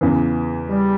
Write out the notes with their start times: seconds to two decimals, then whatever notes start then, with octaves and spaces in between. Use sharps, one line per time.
0.01 E2 C#3 E3
0.69 G3